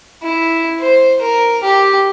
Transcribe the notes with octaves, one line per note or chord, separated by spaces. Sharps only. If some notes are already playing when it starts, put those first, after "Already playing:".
E4
C5
A#4
G4